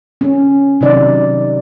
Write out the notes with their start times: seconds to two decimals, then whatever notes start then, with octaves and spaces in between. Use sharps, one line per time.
0.21 C#4
0.81 C3 D#3 F#3 D#4 D5